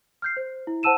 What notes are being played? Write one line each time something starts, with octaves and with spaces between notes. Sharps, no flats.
F6 G6 C7
C5
E4
C5 F#5 A5 E6 D#7 E7